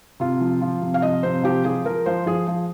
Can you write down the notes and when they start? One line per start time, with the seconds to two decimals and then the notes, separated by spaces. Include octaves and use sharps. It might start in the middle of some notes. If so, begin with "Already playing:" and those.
0.20 C3 F4
0.41 F3
0.61 F3
0.82 C3
0.94 F5
1.02 F3 D#5
1.23 C3 C5
1.43 F3 G4
1.65 F3 G#4
1.85 F3 A#4
2.06 F3 C5
2.26 F3 G#4
2.47 F3